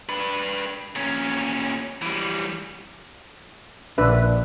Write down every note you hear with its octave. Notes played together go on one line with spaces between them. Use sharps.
D4 B4
A#2 C#4
E3 G3
A#1 D4 B4 E5